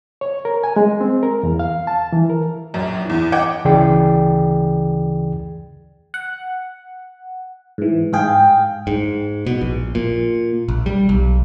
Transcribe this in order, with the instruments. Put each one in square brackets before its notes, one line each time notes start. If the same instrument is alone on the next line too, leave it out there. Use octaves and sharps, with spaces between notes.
[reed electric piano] C#5
A#4
G#5
G#3
C4
A#4
E2
F5
A5
E3
A#4
[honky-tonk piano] A#1 F#2
E2 E3
D#5 F#5 G5 D6 G#6
[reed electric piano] D2 C#3 E3 G#4 D5 G5
[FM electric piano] F#5
G#2 E3
[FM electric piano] G#2 G#4 [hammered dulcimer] F5 G5
[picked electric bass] G#2
B2
A#1
A#2
A#1
G3
B1